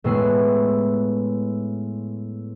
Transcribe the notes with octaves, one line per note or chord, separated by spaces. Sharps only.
A2 G#3 B3 C#6 E6 C7